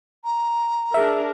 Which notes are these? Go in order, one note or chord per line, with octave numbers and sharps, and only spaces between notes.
A#5
D4 G#4 A#4 E5